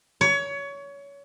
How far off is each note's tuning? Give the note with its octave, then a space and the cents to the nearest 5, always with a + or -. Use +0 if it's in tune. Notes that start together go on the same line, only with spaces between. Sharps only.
C#5 +25